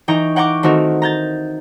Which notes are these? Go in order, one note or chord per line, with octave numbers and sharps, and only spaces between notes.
E3 D#4 G5 A#5 C#6
F#5 G5 A#5 C#6 D6
D#3 A3 C4 D#4 F#4 A#4
A#5 G6 A6